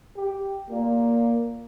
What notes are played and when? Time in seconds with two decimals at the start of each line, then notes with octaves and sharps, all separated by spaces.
0.16 G4
0.70 A#2 A#3